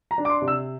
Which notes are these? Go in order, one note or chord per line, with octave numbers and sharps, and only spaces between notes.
A#5
D4
D6
C6
C3
E6